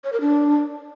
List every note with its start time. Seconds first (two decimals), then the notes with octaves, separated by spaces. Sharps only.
0.04 C#5
0.13 A#4
0.21 D4